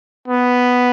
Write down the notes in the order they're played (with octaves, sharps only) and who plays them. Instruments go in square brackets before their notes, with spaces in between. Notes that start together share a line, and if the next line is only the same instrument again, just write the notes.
[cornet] B3